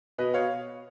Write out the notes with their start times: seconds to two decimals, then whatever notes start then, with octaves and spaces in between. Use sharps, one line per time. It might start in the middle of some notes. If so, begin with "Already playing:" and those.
0.18 B2 B4 D#5
0.34 C#5 F5